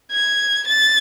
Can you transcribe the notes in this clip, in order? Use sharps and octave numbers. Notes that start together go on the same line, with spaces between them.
G#6
A6